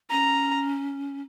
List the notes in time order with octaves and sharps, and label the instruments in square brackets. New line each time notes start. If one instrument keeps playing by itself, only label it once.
[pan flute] C#4 [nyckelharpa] A#5